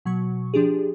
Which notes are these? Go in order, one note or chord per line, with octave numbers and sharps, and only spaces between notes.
B2 F#3 C#6
F3 D4 G4 G#4